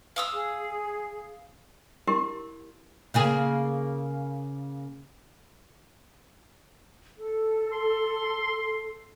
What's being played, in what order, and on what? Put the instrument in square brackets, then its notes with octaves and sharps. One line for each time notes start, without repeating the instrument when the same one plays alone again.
[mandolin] F5 D#6 E6
[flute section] G#4
[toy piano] E4 G4 A#4 C6
[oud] C#3 A#3 G#4
[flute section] A4
[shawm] C6